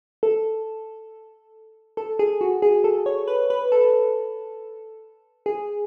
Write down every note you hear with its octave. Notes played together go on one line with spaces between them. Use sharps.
A4
A4
G#4
F#4
G#4
A4
C#5
B4
B4
A4
G#4